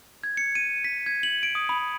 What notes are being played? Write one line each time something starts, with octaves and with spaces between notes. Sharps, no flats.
G#6
C#7
D#7
B6
G#6
F#7
D7
D#6
B5